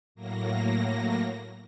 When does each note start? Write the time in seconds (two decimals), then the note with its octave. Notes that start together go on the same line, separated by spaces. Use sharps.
0.15 A2 F#3 A#3 A#6